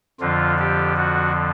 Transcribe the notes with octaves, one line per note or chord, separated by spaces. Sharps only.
F2 D3 F3 F4
G4
F#4